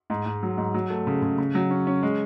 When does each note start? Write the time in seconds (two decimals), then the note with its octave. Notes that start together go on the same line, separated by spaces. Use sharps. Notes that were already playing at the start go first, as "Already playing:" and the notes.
0.10 G#2
0.26 G#2
0.43 F#3
0.58 G#2
0.74 F#3
0.90 A3
1.07 C#3
1.22 C#3
1.38 C#3
1.55 F#3
1.71 C#4
1.87 C#4
2.03 G#3